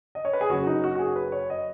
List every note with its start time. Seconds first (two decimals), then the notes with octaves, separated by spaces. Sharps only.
0.15 D#5
0.25 C#5
0.33 B4
0.41 G#4
0.50 F#1 F#2 F#3 C#4 F#4
0.67 D#4
0.84 F#4
0.95 F#4
0.99 G#4
1.16 B4
1.32 C#5
1.50 D#5